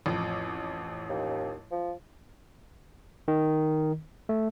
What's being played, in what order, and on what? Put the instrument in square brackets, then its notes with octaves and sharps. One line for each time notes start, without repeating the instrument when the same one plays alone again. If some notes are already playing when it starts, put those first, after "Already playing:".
[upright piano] A1 F2
[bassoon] D#2
F3
[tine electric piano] D#3
A3